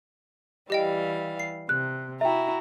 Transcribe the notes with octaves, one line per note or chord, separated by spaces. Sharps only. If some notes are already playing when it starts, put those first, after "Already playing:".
E3 G3 G4 D#5 F5 G5
C7
C3 F#6
E4 F#4 E5 G5 A#5